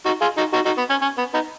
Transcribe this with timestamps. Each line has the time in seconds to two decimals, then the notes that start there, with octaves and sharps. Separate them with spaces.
0.06 D#4 F#4
0.21 F4 G#4
0.37 D#4 F#4
0.54 D#4 F#4
0.66 D#4 F#4
0.78 B3
0.90 C#4
1.02 C#4
1.18 B3
1.34 B3 D#4